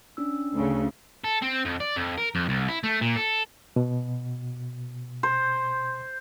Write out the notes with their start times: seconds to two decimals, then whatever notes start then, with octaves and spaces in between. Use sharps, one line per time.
0.17 C#4 D4 E6
0.54 D2 C#3
1.24 A4
1.42 C4
1.65 F2
1.80 D5
1.96 F2
2.18 A#4
2.35 F2
2.49 C2
2.68 E4
2.84 A3
3.01 A#2
3.16 A4
3.76 B2
5.23 C5